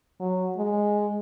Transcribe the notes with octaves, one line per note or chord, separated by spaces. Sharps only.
F#3
G#3